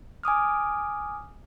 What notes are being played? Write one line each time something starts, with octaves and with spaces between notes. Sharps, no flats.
G#5 D6 D#6 F6